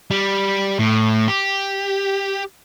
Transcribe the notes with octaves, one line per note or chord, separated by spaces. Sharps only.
G3
A2
G4